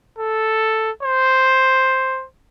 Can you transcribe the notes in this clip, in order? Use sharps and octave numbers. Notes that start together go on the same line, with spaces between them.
A4
C5